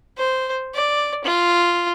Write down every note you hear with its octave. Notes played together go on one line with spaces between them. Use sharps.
C5
D5
F4